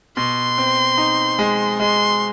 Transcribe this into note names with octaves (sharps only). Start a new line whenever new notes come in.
B2 C6
C4
D#4
G#3
G#3 C6